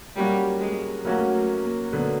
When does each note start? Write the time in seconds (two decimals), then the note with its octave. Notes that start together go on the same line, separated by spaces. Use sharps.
0.16 F#3 G3 A#3 C#4 F#4
0.60 G#3
1.04 F#3 A3 A#3 C#4 F#4
1.33 A3
1.63 A#3
1.93 D3 F#3 B3